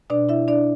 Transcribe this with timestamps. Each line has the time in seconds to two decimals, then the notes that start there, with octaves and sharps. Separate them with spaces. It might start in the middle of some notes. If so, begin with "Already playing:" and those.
0.10 B2 D4 D5
0.29 E4 E5
0.48 D4 D5